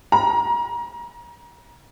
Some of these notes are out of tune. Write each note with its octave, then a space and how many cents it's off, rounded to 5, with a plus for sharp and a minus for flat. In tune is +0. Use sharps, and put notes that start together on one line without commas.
A#5 +25